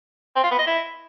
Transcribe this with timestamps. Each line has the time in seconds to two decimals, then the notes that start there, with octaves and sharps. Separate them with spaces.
0.36 C4
0.43 F4
0.51 B3
0.59 D#5
0.67 E4